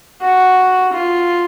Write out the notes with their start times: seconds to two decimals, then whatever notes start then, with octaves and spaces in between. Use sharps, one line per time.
0.22 F#4
0.92 F4